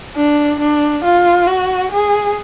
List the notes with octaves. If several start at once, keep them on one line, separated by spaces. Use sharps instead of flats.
D4
D4
F4
F#4
G#4